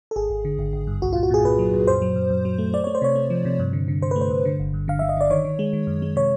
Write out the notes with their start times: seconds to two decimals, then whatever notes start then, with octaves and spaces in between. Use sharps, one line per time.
0.11 A4
0.16 G#1 G#4
0.30 G#1
0.45 D3
0.59 G#1
0.73 G#1
0.87 G2
1.02 C2 F#4
1.13 F4
1.15 A#2
1.23 F#4
1.31 A#2 G#4
1.45 A#2 B4
1.59 F#3
1.74 A#2
1.87 F#2 C5
2.02 F#3
2.16 F#2
2.30 F#2
2.45 F#3
2.58 A3
2.73 A3 D5
2.84 A3 C#5
2.95 C5
3.02 C3 C#5
3.16 A3
3.30 F3
3.45 C3
3.60 G2
3.73 D3
3.88 D3
4.02 D3 C5
4.11 B4
4.16 A3
4.21 C5
4.30 G2
4.45 D3
4.59 G1
4.74 G2
4.88 D3 F5
4.99 D3 E5
5.09 D#5
5.17 D3 D5
5.30 D#3 C#5
5.45 D#3
5.59 G#3
5.73 D#3
5.87 F#2
6.02 G#3
6.16 C3 C#5